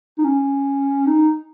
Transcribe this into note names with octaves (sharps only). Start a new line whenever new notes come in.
D#4
C#4
D#4